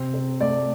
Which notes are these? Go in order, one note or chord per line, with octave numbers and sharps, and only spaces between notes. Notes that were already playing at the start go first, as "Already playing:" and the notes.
Already playing: C3 C4
C4
A3 D5